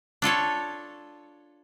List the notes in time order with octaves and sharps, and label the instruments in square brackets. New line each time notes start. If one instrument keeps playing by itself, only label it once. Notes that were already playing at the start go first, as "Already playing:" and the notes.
[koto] D4 F4 A4 C#5